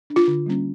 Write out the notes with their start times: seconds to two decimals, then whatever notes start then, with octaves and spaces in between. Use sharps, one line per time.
0.10 D4
0.16 F4
0.28 D3
0.46 G3 A#3 C#4